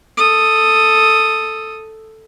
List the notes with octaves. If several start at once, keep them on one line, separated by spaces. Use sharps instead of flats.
A4 D#6